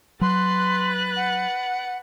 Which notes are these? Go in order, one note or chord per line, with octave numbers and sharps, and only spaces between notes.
F#3 B4 C6 F#6 A6
F#5